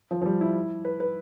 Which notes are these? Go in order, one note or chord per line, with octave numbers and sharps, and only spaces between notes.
F3
F3
G3
E4
B4
B4